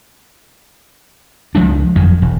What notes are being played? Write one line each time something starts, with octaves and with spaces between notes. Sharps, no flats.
C#2 F3 G#3 D4
G1 F2 F3 F#3
E1